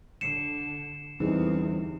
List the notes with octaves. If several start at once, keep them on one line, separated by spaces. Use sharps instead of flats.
D3 C7 C#7 E7
E2 D3 E3 G3 C4 D#4 G4 G#4